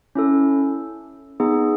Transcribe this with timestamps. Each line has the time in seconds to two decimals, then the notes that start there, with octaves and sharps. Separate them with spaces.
0.15 C#4 E4 A4
1.40 B3 D#4 G#4